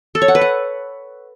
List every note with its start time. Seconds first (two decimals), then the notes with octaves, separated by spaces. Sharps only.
0.15 A4
0.22 C#5
0.28 F#5
0.35 B4
0.41 F#5